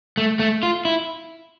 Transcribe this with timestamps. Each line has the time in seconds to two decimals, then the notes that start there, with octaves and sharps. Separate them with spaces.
0.17 A3
0.39 A3
0.63 F4
0.85 E4